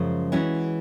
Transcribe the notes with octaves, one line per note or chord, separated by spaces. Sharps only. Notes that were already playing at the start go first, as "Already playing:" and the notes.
Already playing: F#2 C#3 F3 G#3
E3 G#3 C#4 F#4